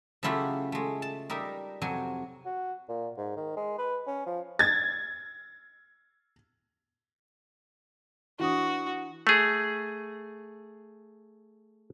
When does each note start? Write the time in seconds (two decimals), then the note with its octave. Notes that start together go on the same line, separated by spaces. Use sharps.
0.23 C#3 F#3 A3 E4 F4 G4
0.72 G#3 A3
1.02 A5
1.30 G3 D#4 A#4 E5
1.82 F2 C3 F#3 G#5
2.45 F#4
2.89 A#2
3.17 G#2
3.36 D#3
3.57 G#3
3.78 B4
4.07 C#4
4.27 F3
4.59 G#6 A6
8.39 E3 D4 F#4 D#6
9.27 A3 G#4